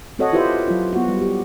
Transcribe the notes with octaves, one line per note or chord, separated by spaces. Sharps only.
C4 F#4 A4 C#5 D#5 F#5
E4 F4 G4 B4 C5 E5
F#3 F4
B3 F#4
G3
G4